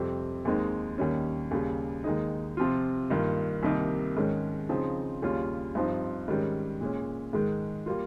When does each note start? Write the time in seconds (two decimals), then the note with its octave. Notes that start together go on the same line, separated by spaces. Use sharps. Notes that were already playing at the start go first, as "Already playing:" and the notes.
Already playing: F2 C3 G3 C4
0.45 D#2 D#3 G#3 C4 D#4
0.98 D#2 D#3 G3 C#4
1.51 D#2 C#3 G3
2.04 D#2 D#3 G#3 D#4
2.57 C3 F3 C4 F4
3.10 G2 D#3 A#3 F4
3.63 C2 C3 D#3 A#3 D#4
4.17 G#2 D#3 G#3 C#4
4.69 C#3 F3 C4 D#4
5.22 D#2 C#3 G3 C#4 F4
5.75 G2 F3 C4 D#4
6.28 G#2 D#3 G3 C#4
6.81 A#2 G#3 C#4
7.33 G#2 D#3 G#3
7.86 G3 A#3 F4